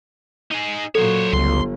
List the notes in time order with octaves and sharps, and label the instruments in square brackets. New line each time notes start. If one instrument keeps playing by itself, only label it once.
[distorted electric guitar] D#4 G#4
[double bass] A#2 F#3 [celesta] A4 [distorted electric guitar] C5 C#5
[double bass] G1 [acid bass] C#2 [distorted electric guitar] C6